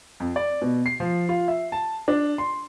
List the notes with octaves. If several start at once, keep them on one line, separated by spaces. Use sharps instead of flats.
F2
D5
B2
C7
F3
F4
E5
A5
D4
C6